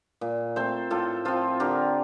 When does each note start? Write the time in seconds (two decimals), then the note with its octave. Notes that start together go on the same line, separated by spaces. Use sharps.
0.21 A#2
0.56 A3 C4 A4 C5
0.90 A2 F4 A4
1.25 F3 C4 F4 A4
1.60 D3 G4 A#4